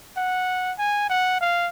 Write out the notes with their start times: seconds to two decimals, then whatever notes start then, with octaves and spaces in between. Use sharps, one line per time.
0.17 F#5
0.79 G#5
1.10 F#5
1.41 F5